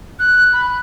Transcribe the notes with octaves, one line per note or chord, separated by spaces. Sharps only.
F#6
B5